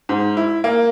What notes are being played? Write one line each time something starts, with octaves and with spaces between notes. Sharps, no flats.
G#2
E4
A#3